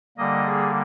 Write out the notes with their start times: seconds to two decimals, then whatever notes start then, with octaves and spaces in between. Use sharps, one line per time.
0.18 D3 G3 A#3 D#5
0.46 G#4